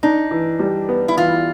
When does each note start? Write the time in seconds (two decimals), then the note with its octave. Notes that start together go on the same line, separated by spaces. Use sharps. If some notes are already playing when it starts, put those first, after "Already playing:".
0.03 D4 D#4
0.31 E3
0.59 G3
0.89 B3
1.08 E4
1.17 E3 F4